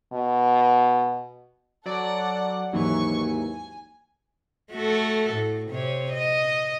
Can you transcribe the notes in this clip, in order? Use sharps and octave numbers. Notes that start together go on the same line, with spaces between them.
B2
F#3 A4 D5 F#5
D#2 G#2 E3 F#3 G#5 C#6
G#5
A3 F#4 A4
A2
C3 C#5
D#5